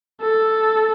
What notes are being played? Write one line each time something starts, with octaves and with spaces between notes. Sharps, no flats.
A4